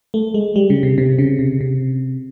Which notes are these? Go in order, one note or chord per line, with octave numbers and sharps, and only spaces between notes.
A3
G#3
G3
C#3
C3
C3
C#3
C3
C3